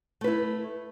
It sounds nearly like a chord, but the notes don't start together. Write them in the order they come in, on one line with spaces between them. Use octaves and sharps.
A3 B4 E4